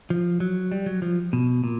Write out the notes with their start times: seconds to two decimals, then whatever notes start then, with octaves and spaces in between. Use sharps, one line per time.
0.10 F3
0.40 F#3
0.72 G3
0.86 F#3
1.02 F3
1.33 B2
1.64 A#2